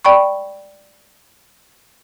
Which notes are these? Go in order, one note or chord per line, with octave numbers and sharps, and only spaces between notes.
D5 G5 B5 C#6